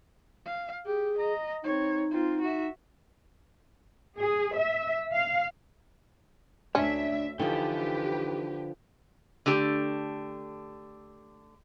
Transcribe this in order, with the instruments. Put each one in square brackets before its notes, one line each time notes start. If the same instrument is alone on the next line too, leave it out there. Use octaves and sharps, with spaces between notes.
[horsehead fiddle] F5
[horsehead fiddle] G4 [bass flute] G#4
[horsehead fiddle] D#5 A#5
[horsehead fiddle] C4 C#5 [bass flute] D#4
[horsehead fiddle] C4 F4
F#4 E5
[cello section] G#4
E5
F5
[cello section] D2 E5 [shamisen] C#4 [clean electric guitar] D4
[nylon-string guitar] D3 F3 [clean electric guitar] E3 D#4 G5 [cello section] G4 B4
[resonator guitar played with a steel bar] D3 A3 G4